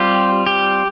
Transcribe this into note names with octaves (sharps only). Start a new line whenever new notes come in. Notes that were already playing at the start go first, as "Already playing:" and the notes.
Already playing: G3 C4 F4 G4
G4